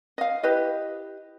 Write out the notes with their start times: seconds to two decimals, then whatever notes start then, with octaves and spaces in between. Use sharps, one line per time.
0.18 D#5 F5
0.43 E4 G4 B4 D#5